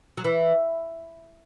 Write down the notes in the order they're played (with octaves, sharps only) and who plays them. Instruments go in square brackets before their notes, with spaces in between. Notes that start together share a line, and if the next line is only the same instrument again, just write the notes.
[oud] F#3
E3